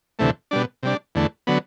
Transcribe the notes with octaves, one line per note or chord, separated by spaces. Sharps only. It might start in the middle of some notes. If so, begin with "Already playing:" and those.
D2 C3 E3 A3
B2 G3 D4
C3 G3 D4
E2 D3 A3
D3 F#3 B3